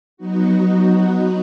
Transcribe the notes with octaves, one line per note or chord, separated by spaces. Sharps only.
F#3 B3 D#4 F#4